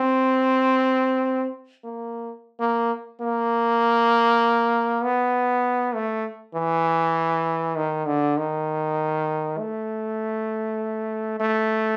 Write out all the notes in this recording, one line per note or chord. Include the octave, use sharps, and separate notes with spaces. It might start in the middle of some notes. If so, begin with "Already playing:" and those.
Already playing: C4
A#3
A#3
A#3
B3
A3
E3
D#3
D3
D#3
A3
A3